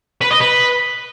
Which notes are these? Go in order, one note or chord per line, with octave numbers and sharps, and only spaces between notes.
B4
D#5
B4